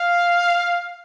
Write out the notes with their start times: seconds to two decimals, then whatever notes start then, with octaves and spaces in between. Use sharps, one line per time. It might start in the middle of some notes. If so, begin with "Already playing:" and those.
Already playing: F5